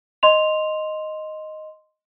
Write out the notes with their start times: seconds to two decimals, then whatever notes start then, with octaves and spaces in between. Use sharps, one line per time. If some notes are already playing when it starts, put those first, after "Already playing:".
0.23 D#5 C6 F7